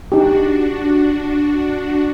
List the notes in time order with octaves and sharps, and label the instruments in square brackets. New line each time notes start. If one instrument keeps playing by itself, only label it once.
[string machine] D4 F#4 [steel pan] D#4 G4